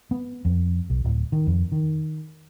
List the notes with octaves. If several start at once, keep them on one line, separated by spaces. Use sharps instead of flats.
B3
F2
B1
D1
D#3
F2
D#3